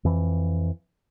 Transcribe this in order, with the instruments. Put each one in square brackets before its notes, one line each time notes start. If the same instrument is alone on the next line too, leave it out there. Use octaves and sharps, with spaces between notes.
[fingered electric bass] F2 E3